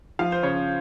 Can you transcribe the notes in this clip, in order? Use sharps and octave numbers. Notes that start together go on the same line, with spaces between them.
F3 F5
C5
C#3 C#5